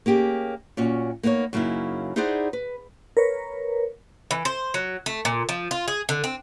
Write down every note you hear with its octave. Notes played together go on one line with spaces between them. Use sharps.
A#3 C#4 G4 G#4
A#2 C#4 F#4
A#3 B3 D#4 B4 C#5
F#2 C#3 A#3 D#4 E4
D#4 E4 G#4 C5 D5 F#5
B4
A#4 B4 C#5
E3
C5
F#3
A3
A#2
F3
F4
G#4
D3
C4